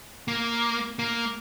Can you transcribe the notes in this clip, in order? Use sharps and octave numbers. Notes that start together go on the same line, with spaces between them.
A#3
A#3